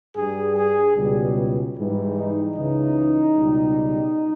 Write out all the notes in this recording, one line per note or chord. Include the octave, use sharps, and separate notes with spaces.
G2 G3 G#4
G#4
C#2 B2 G3
G#2 E3 G3
D#4
C#2 C#3 E3 D#4
C#2 B2 G3